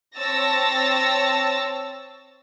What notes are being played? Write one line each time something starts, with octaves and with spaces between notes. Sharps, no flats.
C4 C#5 A5 E6 A6 A#6